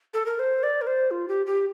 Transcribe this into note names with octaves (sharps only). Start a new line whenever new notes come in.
A4
A#4
C5
D5
A#4
C5
F4
G4
G4